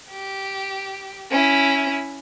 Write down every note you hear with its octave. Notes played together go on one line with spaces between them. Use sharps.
G4
C#4 E4